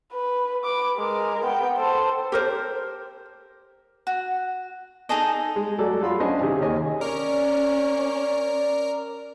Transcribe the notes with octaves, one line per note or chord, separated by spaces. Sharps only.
B4
B4 D6
G#3 A#4
B3 G5
A4 C5
G4 A#4 C5
F#4
D#4 G#4 A4 D#5
G#3
F#3 A3 A4 D5
F#3 F4 B5 C6
C#4 D4 C5 D#5 G#5
C3 D#3 G4 G#4
D#2 C#5 D#5 G#5
C#4 A#4 D5